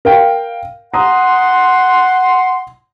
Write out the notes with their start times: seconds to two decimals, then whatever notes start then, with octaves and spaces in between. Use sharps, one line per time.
0.05 A#4 F5 G5
0.94 F#5 A#5 C6 D#6